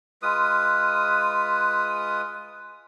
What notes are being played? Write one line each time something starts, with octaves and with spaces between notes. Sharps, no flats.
G#3 F4 B4 D#6